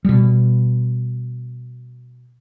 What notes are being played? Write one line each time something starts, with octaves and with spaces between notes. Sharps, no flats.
B2 G3